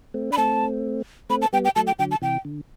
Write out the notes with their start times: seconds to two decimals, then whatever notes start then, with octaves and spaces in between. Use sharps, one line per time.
0.14 A3 C4
0.31 D4 B5
0.37 A3 C4 A5
1.30 A3 C4 B5
1.42 A5
1.53 G3 B3 G5
1.65 G5
1.76 F#3 A3 A5
1.87 G5
1.99 D3 F#3 G5
2.11 A5
2.22 C3 E3 G5
2.45 D3